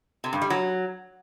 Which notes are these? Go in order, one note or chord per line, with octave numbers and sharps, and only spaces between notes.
C3
G2
G3
F#3